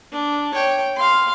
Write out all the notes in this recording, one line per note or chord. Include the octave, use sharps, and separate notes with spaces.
D4
C#5 G5
F5 C6